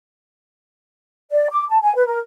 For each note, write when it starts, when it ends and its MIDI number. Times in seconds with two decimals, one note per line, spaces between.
1.31 1.47 74
1.51 1.65 86
1.69 1.79 81
1.82 1.94 80
1.95 2.07 71
2.07 2.19 70